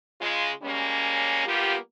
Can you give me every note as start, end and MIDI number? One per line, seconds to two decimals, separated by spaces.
0.21 0.51 49
0.21 0.51 56
0.21 0.51 65
0.63 1.43 55
0.63 1.43 56
0.63 1.43 58
0.63 1.43 61
1.47 1.75 55
1.47 1.75 58
1.47 1.75 59
1.47 1.75 65
1.47 1.75 67